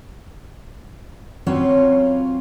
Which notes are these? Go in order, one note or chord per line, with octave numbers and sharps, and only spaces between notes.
F#3 C4 C#4 F4 B4 C#5